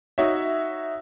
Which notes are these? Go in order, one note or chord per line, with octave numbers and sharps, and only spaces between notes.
D#4 F#4 C#5 E5